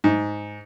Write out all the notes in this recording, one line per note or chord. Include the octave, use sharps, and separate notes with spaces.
G#2